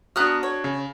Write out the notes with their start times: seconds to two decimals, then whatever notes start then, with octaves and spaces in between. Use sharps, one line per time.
0.16 B3 D4 F#4 A#5 D#6 F6 F#6
0.43 C#5
0.64 C#3